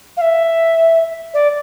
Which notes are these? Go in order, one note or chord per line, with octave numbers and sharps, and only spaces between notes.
F5
E5
D5